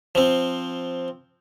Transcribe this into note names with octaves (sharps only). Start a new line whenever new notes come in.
F3 C4